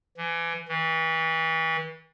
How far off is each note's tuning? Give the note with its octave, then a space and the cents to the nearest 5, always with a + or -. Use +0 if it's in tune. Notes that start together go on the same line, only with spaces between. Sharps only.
E3 +30
E3 -30